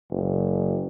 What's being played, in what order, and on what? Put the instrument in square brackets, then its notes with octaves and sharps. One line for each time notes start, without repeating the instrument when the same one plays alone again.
[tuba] F#1